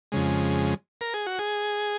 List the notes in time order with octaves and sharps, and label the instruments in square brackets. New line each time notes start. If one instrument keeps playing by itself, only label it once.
[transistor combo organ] F2 C#3 G#3
A#4
G#4
F#4
G#4